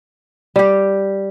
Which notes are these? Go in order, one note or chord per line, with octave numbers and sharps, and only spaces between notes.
G3 G4